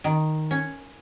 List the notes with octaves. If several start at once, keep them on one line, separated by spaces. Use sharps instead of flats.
D#3
C#4